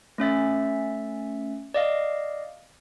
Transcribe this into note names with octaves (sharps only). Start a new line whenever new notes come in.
A3 C#4 E5 A6
D5 D#5 F5